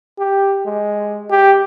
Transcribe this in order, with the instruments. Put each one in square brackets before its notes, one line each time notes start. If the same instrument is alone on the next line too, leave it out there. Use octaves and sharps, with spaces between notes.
[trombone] G4
G#3
G4